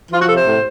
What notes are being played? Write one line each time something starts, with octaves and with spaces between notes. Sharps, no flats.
F3 F4
F#4
C3 A4
C5
A2